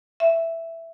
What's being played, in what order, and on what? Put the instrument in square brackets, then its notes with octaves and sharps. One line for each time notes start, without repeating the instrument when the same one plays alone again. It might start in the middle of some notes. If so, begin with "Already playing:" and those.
[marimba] E5